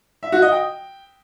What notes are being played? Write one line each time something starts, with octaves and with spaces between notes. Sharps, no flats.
E5
F#4
D#5
G5